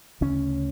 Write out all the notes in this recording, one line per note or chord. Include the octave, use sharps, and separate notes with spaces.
D2 C#3 C#4